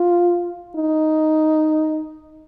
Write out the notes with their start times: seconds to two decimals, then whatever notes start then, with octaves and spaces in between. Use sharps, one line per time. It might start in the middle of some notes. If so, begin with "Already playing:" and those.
Already playing: F4
0.76 D#4